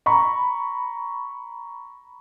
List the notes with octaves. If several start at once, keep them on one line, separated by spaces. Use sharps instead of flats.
A#5 B5 C#6